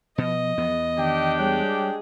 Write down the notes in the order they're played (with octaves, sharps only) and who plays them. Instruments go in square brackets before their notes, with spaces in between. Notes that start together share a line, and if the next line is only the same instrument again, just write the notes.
[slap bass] B2 [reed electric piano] F3 [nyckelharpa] D#5
[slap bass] E2 B3
[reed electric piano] D#3 [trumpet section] D4 G4 G5
[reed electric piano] G3 C#5 F#6 [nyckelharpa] G#3 G#4